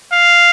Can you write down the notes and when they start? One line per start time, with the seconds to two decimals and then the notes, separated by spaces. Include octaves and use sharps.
0.13 F5